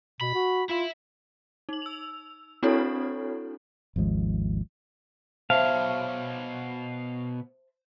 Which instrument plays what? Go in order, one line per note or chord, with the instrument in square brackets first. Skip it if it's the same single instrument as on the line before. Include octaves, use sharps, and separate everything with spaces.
[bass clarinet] B2 [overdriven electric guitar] B5
[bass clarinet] F#4
[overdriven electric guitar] E4 E5 [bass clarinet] F4
[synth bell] D#4 F#7
E6 F7
C4 D4 E4 F#4 A4 C#5
[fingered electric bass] G#1 D#2 F3 G#3
[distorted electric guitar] B2 C#5 [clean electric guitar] C5 E5 A5 [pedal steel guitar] F5